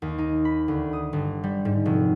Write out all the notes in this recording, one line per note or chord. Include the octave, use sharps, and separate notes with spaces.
D#2
D#4
B5
D2
D#6
G1
G3
G#2
F1